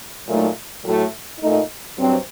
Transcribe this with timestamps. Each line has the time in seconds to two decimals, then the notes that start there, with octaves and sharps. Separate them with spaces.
0.26 A#2 F#3 A3 D#4
0.83 A2 F#3 A3
1.39 A#2 A3 D#4
1.96 G2 F#3 C4